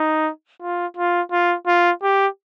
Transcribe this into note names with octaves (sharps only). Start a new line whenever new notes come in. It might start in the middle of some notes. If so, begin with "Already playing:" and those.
Already playing: D#4
F4
F4
F4
F4
G4